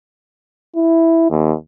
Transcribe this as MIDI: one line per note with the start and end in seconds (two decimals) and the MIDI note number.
0.76 1.28 64
1.30 1.54 39